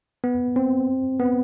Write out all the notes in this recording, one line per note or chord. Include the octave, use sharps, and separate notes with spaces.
B3
C4
B3